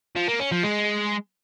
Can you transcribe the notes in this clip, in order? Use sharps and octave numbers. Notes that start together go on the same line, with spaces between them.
F3
A#3
C#4
F3
G#3